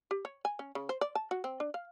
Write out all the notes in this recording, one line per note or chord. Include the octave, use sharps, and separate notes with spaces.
G4
C#5
G#5
C#4
C#3
C5
D5
A5
F#4
C4
D4
F5